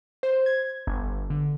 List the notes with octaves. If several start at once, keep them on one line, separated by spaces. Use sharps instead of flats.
C5
G#6
G1
D3